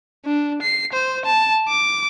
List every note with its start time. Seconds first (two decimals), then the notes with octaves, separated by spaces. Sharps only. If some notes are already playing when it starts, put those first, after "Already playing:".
0.25 D4
0.62 C7
0.93 C5
1.26 A5
1.69 D6